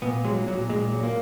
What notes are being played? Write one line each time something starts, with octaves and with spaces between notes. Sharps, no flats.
A#2 B3
F#3 G#3
A#2 F#3
A#2 G#3
F#3
A#3